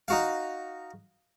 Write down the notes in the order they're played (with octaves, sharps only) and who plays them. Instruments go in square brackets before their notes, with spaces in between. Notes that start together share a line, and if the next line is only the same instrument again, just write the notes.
[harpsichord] D#4 F#4 F5